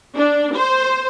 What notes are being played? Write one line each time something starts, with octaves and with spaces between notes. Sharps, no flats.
D4
C5